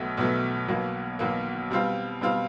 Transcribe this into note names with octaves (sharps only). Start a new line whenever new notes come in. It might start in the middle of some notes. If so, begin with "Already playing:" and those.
Already playing: B1 B2 F#3 A3
B1 B2 F#3 A3
B1 B2 F#3 A#3
B1 B2 F#3 A#3
B2 G3 C4 F4
B2 G3 C4 F4